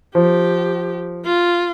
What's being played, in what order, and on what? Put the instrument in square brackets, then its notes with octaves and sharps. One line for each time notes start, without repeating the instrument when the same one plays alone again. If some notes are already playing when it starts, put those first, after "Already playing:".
[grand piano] F3 [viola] G4
[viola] F4